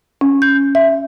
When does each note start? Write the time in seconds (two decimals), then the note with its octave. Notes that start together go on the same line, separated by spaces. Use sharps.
0.21 C#4
0.42 G6
0.75 E5